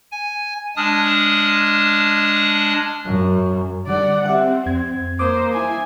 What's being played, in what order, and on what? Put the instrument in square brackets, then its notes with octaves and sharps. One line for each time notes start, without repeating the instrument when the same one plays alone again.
[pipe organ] G#5
G#3 D4 A5 D#6 F6
[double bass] F#2
[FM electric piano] D3 G3 [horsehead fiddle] D5 F#5
[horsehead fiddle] C4 [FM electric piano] G4 E5 F#5
[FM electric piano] F2 G#6
[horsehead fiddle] A#3 C5 [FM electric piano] D6 D#6
[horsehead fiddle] E4 G#5